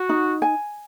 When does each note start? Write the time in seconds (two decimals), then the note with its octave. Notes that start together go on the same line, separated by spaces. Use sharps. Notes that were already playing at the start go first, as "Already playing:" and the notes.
Already playing: F#4
0.09 D#4
0.42 G#5